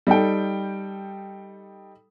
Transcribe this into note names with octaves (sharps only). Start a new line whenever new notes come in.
G3 D#4 A4 G5